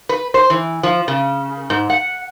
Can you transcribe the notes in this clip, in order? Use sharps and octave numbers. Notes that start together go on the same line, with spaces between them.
B4
C5
E3
F3
C#3
G#2
F#5